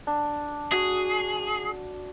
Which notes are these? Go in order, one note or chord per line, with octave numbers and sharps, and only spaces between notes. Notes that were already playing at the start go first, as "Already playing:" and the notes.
D4
F#4 G#4